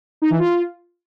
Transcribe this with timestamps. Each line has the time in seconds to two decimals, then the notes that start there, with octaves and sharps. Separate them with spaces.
0.22 D#4
0.30 E3
0.39 F4